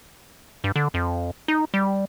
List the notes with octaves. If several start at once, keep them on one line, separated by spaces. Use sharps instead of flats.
G2
D3
F2
D#4
G3